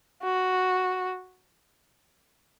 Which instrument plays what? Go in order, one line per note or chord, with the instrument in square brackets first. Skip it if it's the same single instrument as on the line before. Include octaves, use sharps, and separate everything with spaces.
[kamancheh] F#4